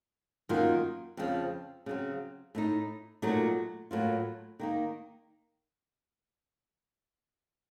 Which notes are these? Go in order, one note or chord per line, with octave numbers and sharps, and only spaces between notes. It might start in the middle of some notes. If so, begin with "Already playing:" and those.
F#2 D#3 A#3 F4
F2 C#3 F3
C#3 F#3 C4
A2 A3 D#4
A#2 F#3 A3 D#4
A2 F#3 A#3 F4
D#3 A#3 D#4